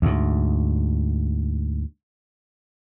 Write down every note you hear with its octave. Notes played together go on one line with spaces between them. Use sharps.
D2 G#2